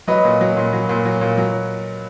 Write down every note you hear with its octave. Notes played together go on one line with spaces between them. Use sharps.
F#3 B4 D#5
A#2
F#3
A#2
F#3
A#2
F#3
A#2
F#3